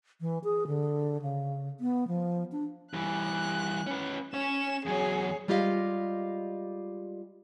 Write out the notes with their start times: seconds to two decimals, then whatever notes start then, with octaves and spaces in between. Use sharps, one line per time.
0.21 E3
0.44 G#4
0.67 D3
1.22 C#3
1.80 B3
2.08 F3
2.52 D4
2.94 E3 G3 F#6
3.87 C#4 B4
4.34 C#4 C#5 E7
4.86 E2 F#3 G#4 C#5
5.48 G3 G#3 F4 G4 D#5 F5